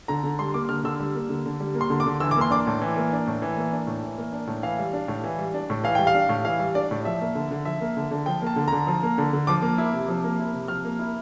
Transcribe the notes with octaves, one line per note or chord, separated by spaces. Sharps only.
D3 A#5
D3
G3 C6
A#3 D6
D3 F6
D3 E6
G3
A#3
D3
D3
G3
A#3
C6
D3
D6
D3
E3 E6
D6
A#3 C6
D4 D6
A2
E3
A#3
D4
A2
E3
A#3
D4
A2
E3
A#3
D4
A2
E3 F5
G3
D4
A2
E3
G3
D4
A2
E3 F5
G3 G5
F5
D4
A2
E3 F5
G3
D4 D5
A2
F3 E5
A#3
D3
D3
F3 E5
A#3
D3
D3
F3 G5
A#3 A5
D3
D3 A#5
F3
A#3
D3
D3
F3 D6
A#3
E4
C3
F3
A#3
E4
C3
F3 F6
A#3
E4